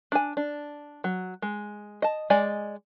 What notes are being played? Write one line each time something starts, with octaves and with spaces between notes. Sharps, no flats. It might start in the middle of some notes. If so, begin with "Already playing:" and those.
D4 G#5
D4
F#3
G#3
D#5 A5
G#3 D5 D#5 G#5